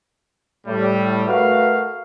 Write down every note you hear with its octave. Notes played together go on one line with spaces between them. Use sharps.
A2 G3
A3 F#4 A#4 B4 F5